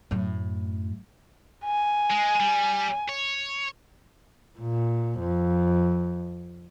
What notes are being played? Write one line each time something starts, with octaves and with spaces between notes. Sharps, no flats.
F#2 A2
G#5
G#3
G3
C#5
A#2
F2